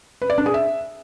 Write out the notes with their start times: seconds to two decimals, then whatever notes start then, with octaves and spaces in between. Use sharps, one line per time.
0.22 B4
0.30 D5
0.38 D4
0.46 G#4
0.54 E5